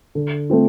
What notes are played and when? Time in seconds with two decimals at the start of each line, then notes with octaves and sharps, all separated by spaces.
0.15 D3
0.50 A3 C4 F4